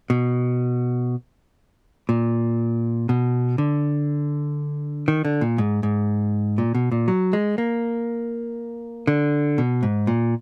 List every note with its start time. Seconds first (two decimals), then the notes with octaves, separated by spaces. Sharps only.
0.10 B2
2.09 A#2
3.09 B2
3.58 D3
5.08 D#3
5.25 D3
5.41 A#2
5.58 G#2
5.83 G#2
6.58 A#2
6.75 B2
6.92 A#2
7.08 F#3
7.33 G#3
7.58 A#3
9.07 D3
9.58 B2
9.83 G#2
10.07 A#2